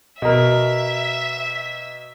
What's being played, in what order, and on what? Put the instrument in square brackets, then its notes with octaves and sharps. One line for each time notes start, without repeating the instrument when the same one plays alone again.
[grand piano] B2 A#4 [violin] E5